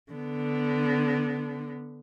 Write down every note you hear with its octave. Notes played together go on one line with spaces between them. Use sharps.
D3 B3